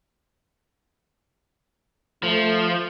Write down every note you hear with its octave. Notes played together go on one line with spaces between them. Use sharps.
F3 A3